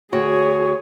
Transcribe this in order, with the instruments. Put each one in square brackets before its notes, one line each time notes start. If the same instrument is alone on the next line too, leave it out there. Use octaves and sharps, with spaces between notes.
[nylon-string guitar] D2 F#4 G5 [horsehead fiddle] G#4 [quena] C#5